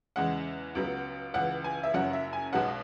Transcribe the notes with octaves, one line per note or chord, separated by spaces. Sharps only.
E2 C#3 G#3 F#5
C#2 C#3 F#3 B3
C#2 C#3 E3 F#5
G#5
E5
F#1 F#2 F#3 C#4 F#5
E5
G#5
B1 B2 G#3 B3 F#5